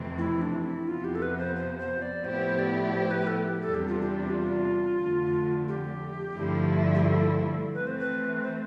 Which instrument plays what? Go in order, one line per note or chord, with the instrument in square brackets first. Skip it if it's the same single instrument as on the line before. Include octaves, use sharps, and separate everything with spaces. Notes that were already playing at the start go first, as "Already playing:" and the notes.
Already playing: [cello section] F2 C3 E3 A3 C4
[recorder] E4
D4
E4
[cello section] F2 C3 F3 B3 [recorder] F4
[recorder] G4
A4
B4
C5
C5
C5
D5
[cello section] A2 F3 B3 E4 G4 [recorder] C5
[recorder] D5
C5
B4
A4
G4
[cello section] E2 C3 G3 D4 [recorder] A4
[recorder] G4
F4
G4
F4
[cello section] F2 D3 A3
[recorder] G4
[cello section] G2 D3 F3 A3 E4
[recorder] G4
A4
[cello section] E3 A3 C4 [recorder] B4
[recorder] C5
B4
C5